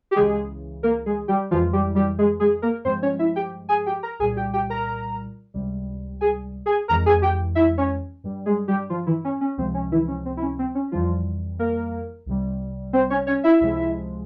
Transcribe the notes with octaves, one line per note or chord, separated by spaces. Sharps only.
G4
C#2 C#3 E3 G#3 G#4
A#3 A#4
G#3 G#4
G3 G4
F2 E3 F3 G#3 F4
G3 G4
G3 G4
G#3 G#4
G#3 G#4
A#3 A#4
G2 F3 G#3 C4 C5
C#4 C#5
E4 E5
G4 G5
G#4 G#5
G4 G5
A#4 A#5
C2 A#2 G3 G#4 G#5
G4 G5
G4 G5
A#4 A#5
C#2 C3 G3
G#4 G#5
G#4 G#5
F2 E3 G#3 A#4 A#5
G#4 G#5
G4 G5
E4 E5
C#4 C#5
G2 G3
G#3 G#4
G3 G4
F3 F4
E3 E4
C#4
C#4
C#2 C3 F3 G#3 C4
C#4
E3 E4
C#4
C4
E4
C#4
C4
C#4
F2 E3 F3 G3 F4
A#3 A#4
C2 C3 G3
C4 C5
C#4 C#5
C#4 C#5
E4 E5
C#2 C3 F3 G#3